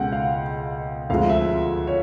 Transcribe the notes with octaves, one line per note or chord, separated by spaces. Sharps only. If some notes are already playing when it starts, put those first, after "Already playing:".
Already playing: C#2 B2 G#3 F#5 G5
F5
D2 C3 F3 G#3 F5
E5
C#5